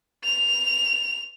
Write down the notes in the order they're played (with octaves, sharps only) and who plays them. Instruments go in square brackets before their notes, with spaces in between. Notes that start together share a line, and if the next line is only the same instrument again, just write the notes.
[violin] F7